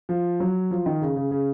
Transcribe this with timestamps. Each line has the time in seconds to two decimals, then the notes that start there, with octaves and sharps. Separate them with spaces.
0.09 F3
0.40 F#3
0.71 F3
0.86 D#3
1.02 C#3
1.16 C#3
1.31 C#3